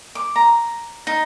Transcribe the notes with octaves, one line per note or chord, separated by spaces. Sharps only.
D6
A#5
D#4